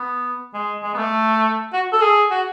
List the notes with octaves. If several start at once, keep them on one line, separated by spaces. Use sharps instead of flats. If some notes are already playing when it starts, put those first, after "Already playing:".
Already playing: B3
G#3
G#3
B3
A3
F#4
A4
G#4
F#4